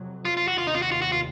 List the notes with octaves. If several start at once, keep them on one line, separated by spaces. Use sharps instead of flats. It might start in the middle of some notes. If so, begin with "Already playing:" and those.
Already playing: F2 C3 F#3
F4
F4
F#4
F1 D#2 D#3 F4
D#4
F4
F#4
F4
F#4
F4